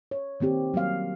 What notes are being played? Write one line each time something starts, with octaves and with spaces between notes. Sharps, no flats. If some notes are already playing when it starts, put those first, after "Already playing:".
C#5
D#3 A#3 C4 G4
F#3 G3 A#3 F5